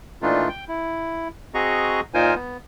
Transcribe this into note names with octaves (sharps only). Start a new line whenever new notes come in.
A#2 E3 A3 D4 D#4 F4
G5
E4
C4 F#4 G#4 D#5 A#5 C#6
A#2 D#4 F4 A#4 C5 G#5
B3